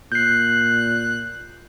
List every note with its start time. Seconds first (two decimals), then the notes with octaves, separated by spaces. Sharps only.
0.12 A#2 F#6 G6 C7